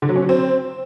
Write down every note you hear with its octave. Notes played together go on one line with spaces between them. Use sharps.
D3
F#3
C#4
F#3
C4